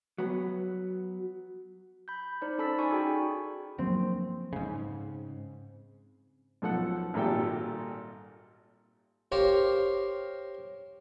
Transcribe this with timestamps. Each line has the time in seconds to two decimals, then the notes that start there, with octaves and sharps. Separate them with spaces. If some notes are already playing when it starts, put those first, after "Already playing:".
0.18 F#3 B3
2.08 B5 G6
2.42 D#4 C5 D5
2.58 C#4 A4 A5 B5 E6 B6
2.79 D#4 D5 G#5 C#6
2.91 D#4 F#4 G#4 G5 B5
3.78 F3 F#3 A#3 C4
4.53 G#2 C#3
6.62 B1 F3 A4 F#5
7.14 G#1 A#2 G3 A4 E5 G5
9.32 G4 A#4 C5 C#5 F5